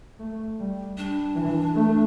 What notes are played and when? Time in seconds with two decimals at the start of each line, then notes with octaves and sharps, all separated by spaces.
0.19 A3
0.59 G3
0.97 G3 D4
1.35 E3
1.74 A3